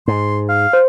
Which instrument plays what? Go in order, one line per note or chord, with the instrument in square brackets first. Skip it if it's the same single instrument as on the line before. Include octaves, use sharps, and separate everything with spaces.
[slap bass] G#2 [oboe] C6
[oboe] F5
[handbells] C5